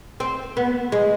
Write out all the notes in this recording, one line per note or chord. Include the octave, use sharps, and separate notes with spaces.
C4
B3
G#3